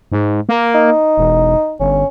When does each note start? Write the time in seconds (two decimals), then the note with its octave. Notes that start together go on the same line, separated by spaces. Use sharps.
0.12 G#2
0.49 A#3
0.75 D#4
1.18 E1
1.80 G1 C#4